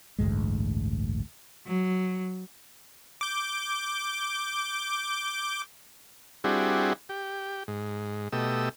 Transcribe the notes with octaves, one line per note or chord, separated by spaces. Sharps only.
A1 D2 G2 G#3
F#3
D6 G6
G3 C4 D4 E4 F#4 G#4
G4
G#2
B2 A3 G4 D#5 E6